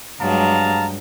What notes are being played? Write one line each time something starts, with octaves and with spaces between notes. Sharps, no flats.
G2 F#3 G#3 F5 A5 A#5